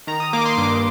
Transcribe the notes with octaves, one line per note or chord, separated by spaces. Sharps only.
D#3 A#5
D#6
A#3 D6
C6
G2 D6